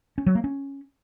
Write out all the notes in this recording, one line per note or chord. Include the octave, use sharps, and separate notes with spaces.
C#4
F#3
A#3
C#4